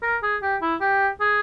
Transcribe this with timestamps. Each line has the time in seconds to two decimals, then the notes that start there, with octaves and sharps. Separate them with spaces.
0.02 A#4
0.23 G#4
0.42 G4
0.61 E4
0.80 G4
1.20 G#4